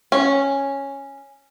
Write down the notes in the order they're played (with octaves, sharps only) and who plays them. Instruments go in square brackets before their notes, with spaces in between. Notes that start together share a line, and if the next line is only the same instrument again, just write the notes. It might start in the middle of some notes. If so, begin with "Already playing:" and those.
[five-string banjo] C#4